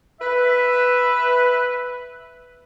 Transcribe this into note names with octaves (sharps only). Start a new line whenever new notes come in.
B4 E5